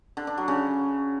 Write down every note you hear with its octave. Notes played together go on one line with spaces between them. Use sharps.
D3
D4
F#3
C#3